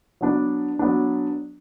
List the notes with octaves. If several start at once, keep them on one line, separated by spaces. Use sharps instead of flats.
F#3 B3 D4
F#3 B3 D4